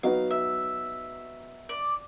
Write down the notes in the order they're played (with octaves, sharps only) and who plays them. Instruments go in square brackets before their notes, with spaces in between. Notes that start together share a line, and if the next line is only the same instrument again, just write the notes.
[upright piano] F#3 B3 D#4 F#4 B4 [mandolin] F5
[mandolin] E5
D5